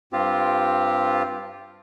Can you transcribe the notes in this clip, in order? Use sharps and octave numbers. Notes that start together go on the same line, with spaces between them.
G2 C4 F4 G4